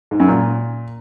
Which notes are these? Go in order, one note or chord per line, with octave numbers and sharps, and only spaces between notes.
G#2
F#2
A#2